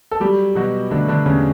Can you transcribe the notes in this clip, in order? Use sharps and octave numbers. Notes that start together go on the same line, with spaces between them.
A4
F#3 G3 G4
B2 F#3 F#4
D3 A3 D4
D3 D4
E2 C#3 C#4